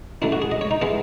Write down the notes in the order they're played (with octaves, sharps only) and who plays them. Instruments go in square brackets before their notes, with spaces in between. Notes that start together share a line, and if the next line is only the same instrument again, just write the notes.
[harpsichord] F#2 D#3 A3 E4
F#4
G#4
D#5
C#5
D#4
E3 G#3 B3 E4